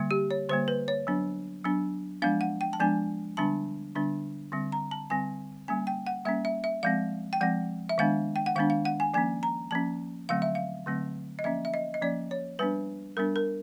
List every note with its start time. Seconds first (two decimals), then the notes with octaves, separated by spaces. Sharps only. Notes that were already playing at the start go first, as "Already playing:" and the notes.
Already playing: D3 G3 A#3
0.11 G4
0.31 C#5
0.49 D3 G3 A#3 C5
0.68 B4
0.88 C#5
1.07 F#3 B3 D4
1.64 F#3 B3 D4
2.22 F3 G#3 B3 D4 F5
2.41 F#5
2.61 G5
2.73 A5
2.80 F3 G#3 B3 D4 G#5
3.37 D3 G3 B3 D4 A5
3.95 D3 G3 B3 D4
4.52 D3 G3 C4
4.72 A#5
4.91 A5
5.10 D3 G3 C4 G#5
5.68 G3 A#3 C#4 G#5
5.87 G5
6.07 F#5
6.25 G3 A#3 C#4 E5
6.45 E5
6.64 E5
6.83 F3 G#3 C4 F5
7.33 G5
7.41 F3 G#3 C4 F#5
7.89 E5
7.98 D#3 G#3 B3 D4 F5
8.36 G5
8.46 F#5
8.55 D#3 G#3 B3 D4 F5
8.70 F5
8.85 F#5
9.00 G#5
9.14 F3 A#3 C#4 G#5
9.43 A#5
9.71 F3 A#3 C#4 A5
10.29 D3 F#3 A3 C4 F5
10.42 E5
10.55 F5
10.86 D3 F#3 A3 C4
11.39 D#5
11.44 F3 A#3 C#4 E5
11.65 E5
11.74 D#5
11.94 D#5
12.02 F3 A#3 C#4 D5
12.31 C#5
12.59 G3 B3 D4 B4
13.17 G3 B3 D4 A#4
13.36 A#4